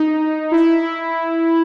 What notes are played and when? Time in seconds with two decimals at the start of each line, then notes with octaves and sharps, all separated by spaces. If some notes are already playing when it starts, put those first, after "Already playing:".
Already playing: D#4
0.52 E4